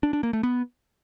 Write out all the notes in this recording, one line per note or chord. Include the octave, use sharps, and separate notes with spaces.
D4
D4
A#3
A3
B3